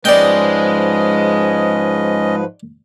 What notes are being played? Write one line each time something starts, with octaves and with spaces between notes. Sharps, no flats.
G#2 F3 G#3 C#4 B4 D5 D#5 G5